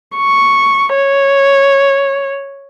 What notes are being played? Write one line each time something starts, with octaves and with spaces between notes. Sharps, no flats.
C#6
C#5